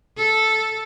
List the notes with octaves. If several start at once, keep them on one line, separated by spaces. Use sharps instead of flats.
A4